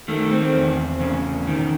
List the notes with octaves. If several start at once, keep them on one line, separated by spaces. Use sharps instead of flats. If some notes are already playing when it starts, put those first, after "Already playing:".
D#3 A3
C4
E2
C#3
D#3